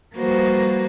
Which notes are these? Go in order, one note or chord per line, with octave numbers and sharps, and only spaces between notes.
F3 G3 A#3 F#4 B4 C5